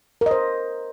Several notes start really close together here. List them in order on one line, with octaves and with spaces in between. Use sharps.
A#4 D#5 C5